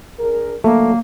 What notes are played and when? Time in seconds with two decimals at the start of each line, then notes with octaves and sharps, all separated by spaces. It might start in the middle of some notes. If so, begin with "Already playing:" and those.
0.19 D4 G#4 A#4
0.64 D3 F#3 A3 A#3